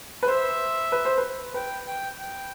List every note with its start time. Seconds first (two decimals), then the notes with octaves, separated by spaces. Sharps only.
0.23 B4
0.28 C5 E5
0.92 B4
1.05 C5
1.18 B4
1.54 B4 G5
1.86 G5
2.18 G5